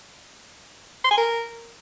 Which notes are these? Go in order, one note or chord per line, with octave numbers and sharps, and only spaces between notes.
C6
G#5
A#4